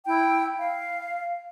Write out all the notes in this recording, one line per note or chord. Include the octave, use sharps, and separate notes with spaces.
E4 G5
F5